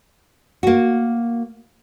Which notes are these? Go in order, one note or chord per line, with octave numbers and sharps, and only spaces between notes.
A#3 F#4